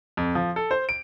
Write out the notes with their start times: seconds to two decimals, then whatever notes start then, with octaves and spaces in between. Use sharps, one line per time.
0.17 F2
0.35 F3
0.56 A4
0.71 C5
0.89 D7